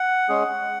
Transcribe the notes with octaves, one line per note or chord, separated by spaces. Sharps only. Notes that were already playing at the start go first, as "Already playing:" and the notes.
Already playing: F#5
G#3 C#4 G#4